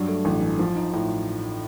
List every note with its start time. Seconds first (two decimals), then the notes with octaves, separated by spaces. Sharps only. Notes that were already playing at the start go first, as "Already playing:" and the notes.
Already playing: G2 F#3
0.08 A3
0.25 A1
0.42 E3
0.59 F3
0.75 D#4
0.93 A2